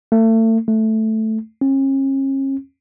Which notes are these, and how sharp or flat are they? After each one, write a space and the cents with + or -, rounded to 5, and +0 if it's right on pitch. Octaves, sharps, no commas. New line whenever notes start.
A3 +35
A3 +0
C#4 -40